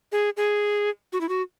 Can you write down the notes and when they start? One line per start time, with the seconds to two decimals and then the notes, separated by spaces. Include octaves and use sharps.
0.12 G#4
0.37 G#4
1.13 F#4
1.21 E4
1.29 F#4